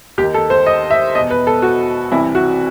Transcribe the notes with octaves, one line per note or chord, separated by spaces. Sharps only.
D#2 D#3 G4
A4
C5
D#5
E5
E2 B2 D#5
B4
A4
F#4
C2 C3 E3 E4
F#4